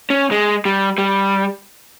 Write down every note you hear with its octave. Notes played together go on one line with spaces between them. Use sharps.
C#4
G#3
G3
G3